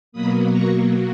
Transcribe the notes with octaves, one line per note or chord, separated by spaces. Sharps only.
B2 F#3 A#3 B5 D#6
A#5 C#6